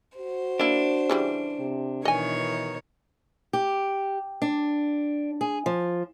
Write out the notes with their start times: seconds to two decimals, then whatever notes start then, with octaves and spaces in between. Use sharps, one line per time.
0.18 F#4 C5
0.60 A#3 D4 E4
1.10 C#3 E3 G3
1.59 C3
2.05 B2 D#3 E3 C#5 D#5 G#5
3.53 G4
4.42 D4
5.41 G#4
5.66 F3